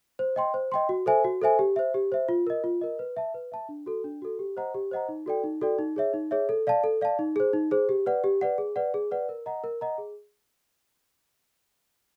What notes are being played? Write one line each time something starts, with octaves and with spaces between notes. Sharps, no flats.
C5
D#5 G5 C6
C5
D#5 G5 C6
F#4
A4 C5 E5 G#5
F#4
A4 C5 E5 G#5
G4
C5 E5
G4
C5 E5
F4
A#4 D#5
F4
A#4 D#5
B4
E5 A5
B4
E5 A5
D4
F#4 A4
D4
F#4 A4
G4
C5 D#5 F#5 A#5
G4
C5 D#5 F#5 A#5
D#4
F#4 A4 D5 G5
D#4
F#4 A4 D5 G5
D#4
G#4 C#5 E5
D#4
G#4 C#5 E5
A4
D5 F5 A5
A4
D5 F5 A5
D#4
G#4 C5
D#4
G#4 C5
G4
B4 D5 F#5
G4
B4 D5 F#5
G#4
B4 D5 F#5
G#4
B4 D5 F#5
A#4
D#5 F#5 A#5
A#4
D#5 F#5 A#5
G#4